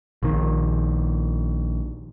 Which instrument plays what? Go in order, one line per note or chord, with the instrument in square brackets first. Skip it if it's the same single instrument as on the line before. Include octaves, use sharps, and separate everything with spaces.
[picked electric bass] A#1 D#3